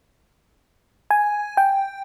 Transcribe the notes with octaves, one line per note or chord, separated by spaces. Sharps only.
G#5
G5